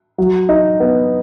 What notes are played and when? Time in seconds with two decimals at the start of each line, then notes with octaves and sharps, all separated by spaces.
0.18 F#3
0.49 D#4
0.80 B3